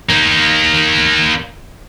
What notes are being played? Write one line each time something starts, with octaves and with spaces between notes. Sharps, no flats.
A#3 D#4